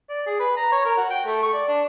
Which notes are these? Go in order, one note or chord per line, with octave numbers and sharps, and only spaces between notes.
D5
G#4
B4
A#5
C#5
A#4
F#4
G5
A3
C#6
D5
D4